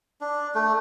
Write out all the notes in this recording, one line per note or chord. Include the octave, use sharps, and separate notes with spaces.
D4
A3